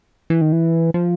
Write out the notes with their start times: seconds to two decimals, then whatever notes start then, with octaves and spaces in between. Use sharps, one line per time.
0.30 E3
0.41 D#3
0.52 E3
0.94 F3